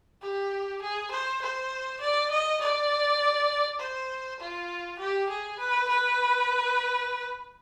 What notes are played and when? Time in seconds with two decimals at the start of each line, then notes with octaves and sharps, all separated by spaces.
0.22 G4
0.82 G#4
1.11 C5
1.42 C5
2.01 D5
2.31 D#5
2.61 D5
3.79 C5
4.40 F4
4.99 G4
5.29 G#4
5.59 B4
5.89 B4